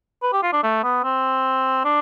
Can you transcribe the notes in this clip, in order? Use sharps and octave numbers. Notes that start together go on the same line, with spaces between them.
B4
G4
F4
D4
A3
B3
C4
D4